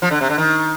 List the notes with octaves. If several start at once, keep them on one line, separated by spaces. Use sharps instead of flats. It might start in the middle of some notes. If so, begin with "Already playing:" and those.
F3
D3
C3
D3
D#3